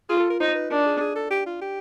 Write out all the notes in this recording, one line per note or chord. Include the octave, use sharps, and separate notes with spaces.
F4 G#4
A4
A#4
D#4 C5
B4
D4 A#4
G#4
G#4
A4
G4
F4
G4